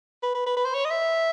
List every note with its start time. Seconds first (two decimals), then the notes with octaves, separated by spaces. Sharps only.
0.23 B4
0.35 B4
0.46 B4
0.57 B4
0.65 C5
0.74 C#5
0.85 D#5
0.90 E5